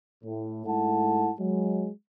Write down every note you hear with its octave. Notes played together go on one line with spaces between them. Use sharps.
A2
G#2 A3 E4 F#5 A5
F#3 G#3